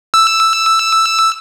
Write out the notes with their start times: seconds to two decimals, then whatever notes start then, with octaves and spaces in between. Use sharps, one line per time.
0.14 E6